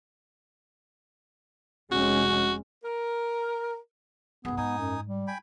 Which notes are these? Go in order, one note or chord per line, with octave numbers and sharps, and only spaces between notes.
F1 G#3 C#4 F#4
A#4
B1 F#2 B3 G#4
G#2 D#4 G#5 D#6
F#2
G3
G5 G#5 B5